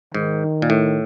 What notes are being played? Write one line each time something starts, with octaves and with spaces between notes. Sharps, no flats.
G#2 D#3
A#2
A2